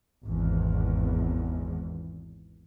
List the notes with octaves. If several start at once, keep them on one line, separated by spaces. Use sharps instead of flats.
G#1 E2